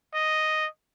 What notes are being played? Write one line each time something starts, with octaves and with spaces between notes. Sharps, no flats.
D#5